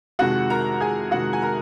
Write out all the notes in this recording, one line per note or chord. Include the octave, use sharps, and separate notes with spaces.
F2 C3 D#3 G#3 F#4 F#5
A#4 A#5
G#4 G#5
F2 C3 D#3 G#3 F#4 F#5
G#5
A#4 A#5